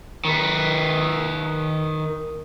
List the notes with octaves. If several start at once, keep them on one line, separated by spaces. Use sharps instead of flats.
D#3 B4